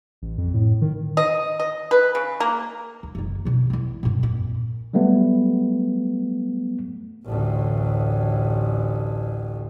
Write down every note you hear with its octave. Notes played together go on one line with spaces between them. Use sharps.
A1
F2
A2
D#3
D#5
D#5
B4
C#3
A#3
D#2
F#1 D#3
B2 D3
A1 E2
G2 A#2
F2 A#2
F#3 G3 A3 B3
A1 D2